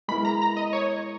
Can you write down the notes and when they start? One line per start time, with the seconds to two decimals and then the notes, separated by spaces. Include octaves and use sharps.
0.08 G#3 B3 E4 A#4 B5
0.25 A#5
0.42 A#5
0.57 D#5
0.73 C#5